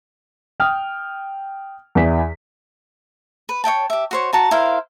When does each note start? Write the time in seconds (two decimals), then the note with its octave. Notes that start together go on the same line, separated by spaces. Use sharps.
0.60 G5 D#6 F6
1.95 E2 E3 D5 B6
3.49 B4
3.64 C#5 E5 G5 A5
3.90 G4 E5
4.11 F#4 C5 C#5
4.33 F#4 A5 A#5
4.51 E4 A#4 C5 F5